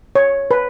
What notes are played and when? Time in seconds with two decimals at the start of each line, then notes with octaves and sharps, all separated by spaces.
0.15 C#5
0.51 B4